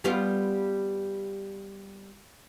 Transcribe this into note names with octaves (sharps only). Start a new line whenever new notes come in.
G3 B3 F4